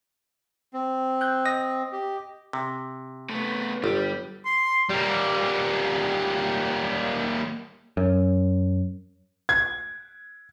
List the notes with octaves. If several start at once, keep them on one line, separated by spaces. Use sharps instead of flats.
C4
F#6 G6
D#5 D#6 A#6
G4
C3
A3 B3
G1 G3
C6
G3 A#3
F#2
G#6